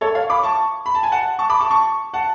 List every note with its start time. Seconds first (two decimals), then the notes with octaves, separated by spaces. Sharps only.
0.01 A4 C#5
0.15 C#5 F5
0.30 B5 D6
0.43 A5 C#6
0.86 B5
0.95 A5
1.03 G#5
1.12 F#5 A5
1.39 A5 C#6
1.50 B5 D6
1.60 A5 C#6
1.71 A5 C#6
2.14 F#5 A5